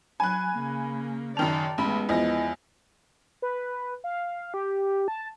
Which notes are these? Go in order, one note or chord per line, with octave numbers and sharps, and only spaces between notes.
F#3 G#5 B5 F#6
C#3 A#3
F#2 D#3 D5 A5 F7
A1 G#3 B3 B5
E2 F3 E4 D#5 A#6
B4
F5
G4
A5